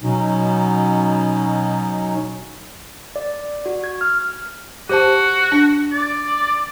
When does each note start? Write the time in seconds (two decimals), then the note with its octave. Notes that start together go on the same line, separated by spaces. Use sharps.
0.03 B2 F#3 C#4 D#4
3.16 D5
3.66 F#4
3.84 G#6
4.01 F6
4.89 F#4 G4 C5 A5
5.52 D4
5.92 D5